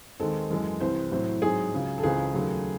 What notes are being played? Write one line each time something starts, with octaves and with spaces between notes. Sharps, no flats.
D#2 D#3 G#3 C4 A4
F#2 E3 G#3
C2 C3 E3 C4 C5
A2 F#3 C4
G#2 F#3 C4 G#4
C#2 C#3 F#3
A4
C#2 C#3 E3 C4 G#4
D#2 C#3 F#3 A3